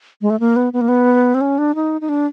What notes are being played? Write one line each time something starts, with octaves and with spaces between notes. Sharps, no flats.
G#3
A3
A#3
B3
B3
A#3
B3
C4
C#4
D4
D#4
D#4
D4